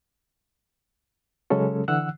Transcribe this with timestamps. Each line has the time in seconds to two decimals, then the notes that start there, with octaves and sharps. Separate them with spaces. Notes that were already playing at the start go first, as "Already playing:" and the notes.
1.50 C#3 F#3 G#3 C#4 A4
1.88 D3 E3 F#5 E6 F#6